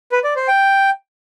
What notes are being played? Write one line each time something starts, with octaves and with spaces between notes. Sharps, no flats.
B4
D5
C5
G5